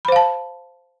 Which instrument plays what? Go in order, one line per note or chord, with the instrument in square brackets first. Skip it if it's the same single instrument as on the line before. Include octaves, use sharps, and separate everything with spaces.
[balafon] B5
C5
F5
A5